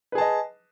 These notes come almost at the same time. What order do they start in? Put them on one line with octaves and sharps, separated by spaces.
B4 G#4 A5 D#5